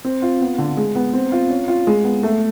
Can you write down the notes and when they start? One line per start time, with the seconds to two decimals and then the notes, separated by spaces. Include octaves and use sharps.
0.05 C4
0.22 F4
0.41 B3
0.58 D3
0.77 G#3
0.95 B3
1.13 C4
1.32 F4
1.50 C#4
1.68 F4
1.87 G#3
2.04 B3
2.23 A3